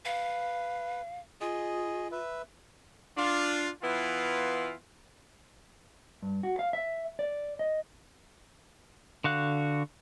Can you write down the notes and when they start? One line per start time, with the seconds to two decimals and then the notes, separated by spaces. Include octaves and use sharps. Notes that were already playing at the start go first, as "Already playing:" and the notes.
0.05 B4 F5
1.41 F4 G#4 D#5
2.12 B4 E5
3.17 D4 F4
3.82 E3 B3 E4 F4
6.22 G2
6.43 F#4
6.59 F5
6.73 E5
7.19 D5
7.59 D#5
9.24 D3 F#4 F5 F#6